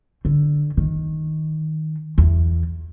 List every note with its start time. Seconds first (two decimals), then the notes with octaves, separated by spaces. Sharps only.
0.25 D3
0.77 D#3
2.18 E2